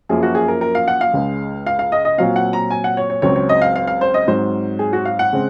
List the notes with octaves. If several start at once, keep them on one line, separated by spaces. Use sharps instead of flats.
F#2 F3 A#3 G#4
F#4
G#4
A#4
A#4
F5
F#5
F5
C#2 C#3 G#3
F5
F5
D#5
D#5
A#2 F#3 C4 F5
F#5
A#5
G#5
F#5
C#5
C#5
C#2 C#3 F#3 C4 C#5
C#5
D#5
F5
F5
F5
C5
D#5
G#2 F#3 C4 C5
G#4
F#4
F5
F#5
C#3 G#3 C4